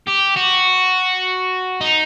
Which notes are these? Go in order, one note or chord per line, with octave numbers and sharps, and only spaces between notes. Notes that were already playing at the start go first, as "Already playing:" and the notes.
G4
F#4
D#4